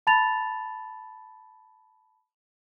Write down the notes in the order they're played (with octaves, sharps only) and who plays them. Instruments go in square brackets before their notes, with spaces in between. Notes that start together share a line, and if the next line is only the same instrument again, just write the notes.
[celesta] A5 B5 A6 F7